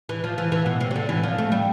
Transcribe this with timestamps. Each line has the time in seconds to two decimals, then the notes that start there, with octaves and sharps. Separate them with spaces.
0.09 E3
0.24 F3
0.38 E3
0.52 E3
0.66 B2
0.80 C3
0.91 C3
0.96 D3
1.09 E3
1.23 F3
1.38 A3
1.52 G3